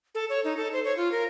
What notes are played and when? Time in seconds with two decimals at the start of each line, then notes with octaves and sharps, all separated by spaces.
0.15 A4
0.30 C#5
0.44 D#4
0.57 A4
0.73 C5
0.84 C#5
0.97 F4
1.12 A#4